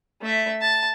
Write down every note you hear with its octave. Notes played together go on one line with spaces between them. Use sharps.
A3 E5
A5